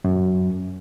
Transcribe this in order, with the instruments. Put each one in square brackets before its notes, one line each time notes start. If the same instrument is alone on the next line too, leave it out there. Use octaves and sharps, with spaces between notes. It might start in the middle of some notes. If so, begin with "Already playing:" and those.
[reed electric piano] F#2